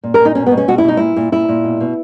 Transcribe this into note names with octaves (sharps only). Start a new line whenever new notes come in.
A#2
A#4
A#2
D#4
B2 C#4
B2 B3
C#4
B2 F#4
E4
B2 D#4
A#2 E4
A#2
A#2 E4
A#2
B2
B2